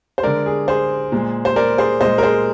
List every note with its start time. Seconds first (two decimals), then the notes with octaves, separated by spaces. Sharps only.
0.18 C5
0.23 D3 G#3 A#4 D5
0.46 G#4
0.68 G#4 C5
1.12 A#2 G#3
1.45 C5
1.56 A#4 D5
1.78 G#4 C5
2.01 A#2 G#3 C5 D#5
2.18 A#4
2.23 G#4 C5